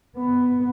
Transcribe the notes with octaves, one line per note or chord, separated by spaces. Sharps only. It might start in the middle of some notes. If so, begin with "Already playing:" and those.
B3